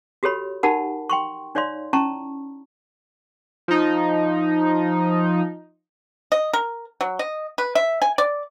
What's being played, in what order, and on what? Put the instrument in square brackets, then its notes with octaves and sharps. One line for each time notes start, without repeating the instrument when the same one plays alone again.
[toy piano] F#4 G4 A4 C#5 B5
D#4 G4 A#4 F#5 A5 B5
G5 C6 C#6
D#4 C#5 D5 F5 C6
C#4 E4 A5 A#5 C#6
[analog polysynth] F3 D#4
[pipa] D#5
A#4
F#3
D#5
B4
E5
G#5
D5